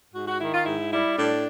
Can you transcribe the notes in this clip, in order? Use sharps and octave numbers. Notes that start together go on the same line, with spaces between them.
G#2 F#4
F#4
D#3 E4
F4
G#2 E4
G3 E4
A2 D4